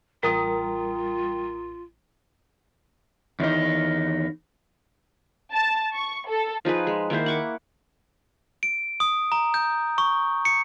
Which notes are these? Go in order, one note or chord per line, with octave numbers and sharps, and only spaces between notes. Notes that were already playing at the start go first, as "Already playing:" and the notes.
A1 G3 F4 A#4 D#6
E2 D#3 D#4
A5
C#6
A4
F3 D#4 G#4 B4
G#3
D#3 A#3 E4 C5
F#5 C#6 D6
D7
D#6
A#5
G6
C#6
C#7